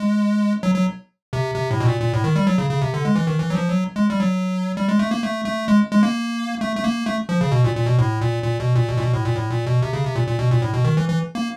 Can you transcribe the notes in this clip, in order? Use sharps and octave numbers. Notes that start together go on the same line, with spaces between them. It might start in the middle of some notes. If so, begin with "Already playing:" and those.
Already playing: G#3
F#3
F#3
C3
C3
A2
B2
A#2
A#2
A2
D#3
G3
F#3
C#3
C#3
C3
D3
G#3
E3
D#3
E3
F#3
F3
F#3
G#3
G3
F#3
G3
G#3
A3
A#3
A3
A3
G#3
G#3
A#3
A3
A3
A#3
A3
F3
C#3
B2
A#2
A#2
B2
A2
A#2
A#2
B2
A#2
B2
A#2
B2
A2
A#2
A2
A#2
B2
C3
C#3
C3
A#2
A#2
B2
A#2
A2
B2
D#3
E3
E3
A#3